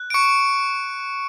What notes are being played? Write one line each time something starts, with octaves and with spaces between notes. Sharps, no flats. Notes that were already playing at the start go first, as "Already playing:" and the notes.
Already playing: F#6
D7
C#6 C#7